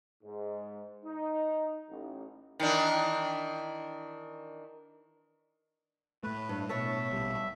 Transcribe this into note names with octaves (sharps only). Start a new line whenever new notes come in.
G#2
D#4
A1
D#3 E3 D4
A2 A3 B4
G2
B2 C#5 E5 A5
A#1 G3